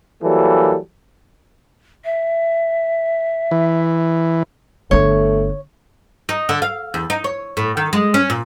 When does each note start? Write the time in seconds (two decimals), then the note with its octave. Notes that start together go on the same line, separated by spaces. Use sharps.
0.23 E3 F#3 G3 A#3 A4
2.04 E5
3.51 E3
4.91 G1 A3 D4 C#5
6.29 D#4
6.49 D3
6.62 F5
6.94 E2
7.10 D#4
7.24 C#5
7.57 A2
7.77 D#3
7.93 G#3
8.14 C#4
8.30 A#2